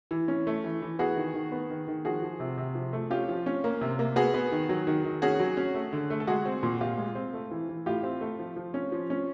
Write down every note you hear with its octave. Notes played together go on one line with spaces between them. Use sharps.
E3
C#4
A3
E3
E3
B3 F#4 G#4
D#3
D#3
B3
D#3
D#3
F3 F#4 G#4
F3
C3
C3
F3
A3
C#4 F4 G4
F3
C#4
A#3
C3
A#3
B3 F#4 G#4
B3
D#3
F#3
D#3
D#3
C#4 F#4 G#4
F#3
C#4
A3
D3
A3
A4
G#3 F#4 G#4
C4
A#2
A#2 F4 G4
G#3
C4
A3
E3
E3
A2 F4 G4
C4
A3
F3
F3
C#4
F3
C#4